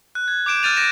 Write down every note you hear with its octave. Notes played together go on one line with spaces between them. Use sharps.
F#6
G#6
D6 G6 D7 E7
F6 G6 A6 D#7 F7
A6 A#6 D7 E7